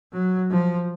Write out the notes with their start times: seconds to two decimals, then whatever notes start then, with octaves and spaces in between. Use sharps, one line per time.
0.13 F#3
0.50 F3